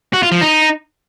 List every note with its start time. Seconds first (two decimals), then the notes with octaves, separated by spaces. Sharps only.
0.13 F#4
0.23 F4
0.32 F3
0.41 D#4